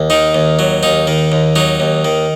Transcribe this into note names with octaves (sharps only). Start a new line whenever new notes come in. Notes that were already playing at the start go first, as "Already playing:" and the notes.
Already playing: D#2
D#3 D#4
D#2
F#3
D#2 D#4
D#3
D#2
F#3 D#4
D#2
D#3